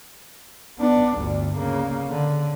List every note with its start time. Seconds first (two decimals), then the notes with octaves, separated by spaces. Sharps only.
0.79 B3 D4
1.18 G1 D2
1.56 C#3 A#3
2.10 D3